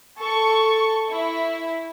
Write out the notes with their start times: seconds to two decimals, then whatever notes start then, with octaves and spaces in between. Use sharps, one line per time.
0.20 A4 C#6
1.10 E4